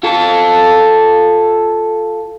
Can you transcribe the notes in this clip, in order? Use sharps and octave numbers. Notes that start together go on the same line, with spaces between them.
F4 A4